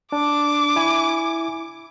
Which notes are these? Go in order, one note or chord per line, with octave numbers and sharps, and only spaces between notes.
D4 D6
E4 G#5